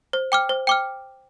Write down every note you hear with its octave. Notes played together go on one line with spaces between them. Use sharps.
C5
G5 D6 F6
C5
G5 D6 F6